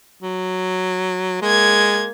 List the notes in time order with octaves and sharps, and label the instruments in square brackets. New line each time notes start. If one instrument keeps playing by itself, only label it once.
[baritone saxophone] F#3
[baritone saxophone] G#3 [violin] A#3 G#6